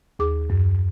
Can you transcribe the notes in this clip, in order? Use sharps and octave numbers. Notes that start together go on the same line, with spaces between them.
D#2 G#4 D6
F#2